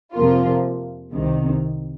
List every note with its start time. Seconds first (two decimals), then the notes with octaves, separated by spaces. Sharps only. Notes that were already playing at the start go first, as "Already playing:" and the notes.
0.13 F2 C3 F3 A#3 F4
1.13 C2 C3 D#3